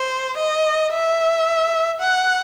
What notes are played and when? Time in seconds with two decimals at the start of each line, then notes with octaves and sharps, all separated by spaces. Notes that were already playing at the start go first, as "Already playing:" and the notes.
Already playing: C5
0.38 D#5
0.93 E5
2.01 F#5